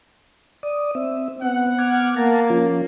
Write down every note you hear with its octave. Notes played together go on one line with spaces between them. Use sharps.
D5 D#6
C4 E5
B3 C4 F#5
D6 F6 G#6
A#3 A5 A#5
F3 C#4 F4